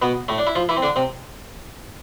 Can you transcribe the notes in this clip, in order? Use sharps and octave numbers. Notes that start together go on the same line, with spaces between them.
B2 B3
A2 A3
D4
E4
F3 F4
E3 E4
C4
D3 D4
C3 C4